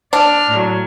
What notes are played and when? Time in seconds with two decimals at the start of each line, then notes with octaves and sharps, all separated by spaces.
0.13 D4 D5 F6
0.51 A2 F#3